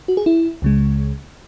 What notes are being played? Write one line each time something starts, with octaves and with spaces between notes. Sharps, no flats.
F#4
G#4
E4
C#2 C#3 G#3